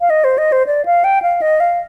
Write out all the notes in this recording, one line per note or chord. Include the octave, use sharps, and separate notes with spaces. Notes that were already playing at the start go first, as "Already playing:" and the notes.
F5
D#5
C5
D#5
C5
D5
F5
G5
F5
D#5
F5